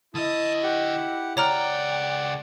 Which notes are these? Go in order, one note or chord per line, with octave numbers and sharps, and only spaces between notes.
D3 E4 D#5 A5 D#6
G4 F#5
C#2 C#5 D5 F#5 G5 A#5 F6